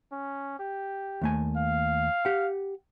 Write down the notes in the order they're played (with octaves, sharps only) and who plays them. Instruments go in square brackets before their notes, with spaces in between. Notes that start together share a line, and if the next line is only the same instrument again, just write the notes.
[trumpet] C#4
G4
[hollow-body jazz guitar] D#2 A3 G#5
[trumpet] F5
[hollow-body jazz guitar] G4 F#5